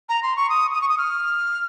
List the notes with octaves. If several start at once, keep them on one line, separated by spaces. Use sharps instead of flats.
A#5
C6
C#6
D#6
D#6
C#6
D#6
F6